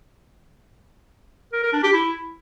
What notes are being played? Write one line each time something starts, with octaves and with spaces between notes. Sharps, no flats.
A#4
A#4
D4
G4
E4